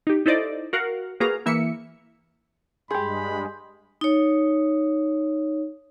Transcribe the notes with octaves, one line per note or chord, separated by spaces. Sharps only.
D#4 G4
D#4 E4 A4 C5 D5 D#5
F#4 A#4 F5 F#5
A#3 F#4 G#4 B4 F5 A#5
E3 A#3 E5 C#7
G2 G#3 G4 G#4 B5 C6 G6
D#4 C#5